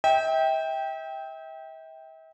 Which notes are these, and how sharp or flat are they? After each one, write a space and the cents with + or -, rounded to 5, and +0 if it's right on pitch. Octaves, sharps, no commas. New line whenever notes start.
E5 -40 G5 +0